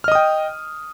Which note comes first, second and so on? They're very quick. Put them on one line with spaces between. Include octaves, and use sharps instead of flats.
F6 D#5 D#6 G5